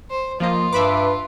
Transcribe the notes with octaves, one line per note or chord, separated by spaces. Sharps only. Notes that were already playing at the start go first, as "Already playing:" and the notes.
C5
F3 A#3 F4 D#5
G2 B4 E5 B5 D6